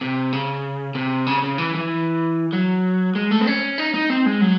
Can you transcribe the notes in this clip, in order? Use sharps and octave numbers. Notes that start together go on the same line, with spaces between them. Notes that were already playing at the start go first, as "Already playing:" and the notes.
C3
C#3
C3
C#3
C#3
E3
E3
F#3
G#3
A3
C4
C#4
D#4
D#4
C4
G#3
F#3